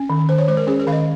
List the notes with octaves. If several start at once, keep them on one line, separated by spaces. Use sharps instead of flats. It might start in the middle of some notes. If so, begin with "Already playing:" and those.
Already playing: C#4
D#3
D#3 C5
C#5
G#3 C5
A#4
C#4 G#4
A#4
D#3 F5
D#5